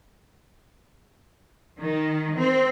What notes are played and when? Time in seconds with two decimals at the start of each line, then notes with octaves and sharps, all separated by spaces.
1.80 D#3
2.37 C4